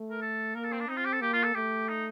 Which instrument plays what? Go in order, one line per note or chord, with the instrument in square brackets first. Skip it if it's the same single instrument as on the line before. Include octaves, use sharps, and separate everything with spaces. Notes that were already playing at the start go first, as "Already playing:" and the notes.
Already playing: [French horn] A3
[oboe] A#4
A4
[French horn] A#3 [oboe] A#4
[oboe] A4
C4
D4
[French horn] C4 [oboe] D#4
[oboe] F4
G4
A4
[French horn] A#3 [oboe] G4
[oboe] F4
A4
[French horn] A3 [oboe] G4
[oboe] D#4